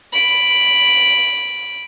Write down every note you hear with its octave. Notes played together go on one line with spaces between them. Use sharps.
B5 D7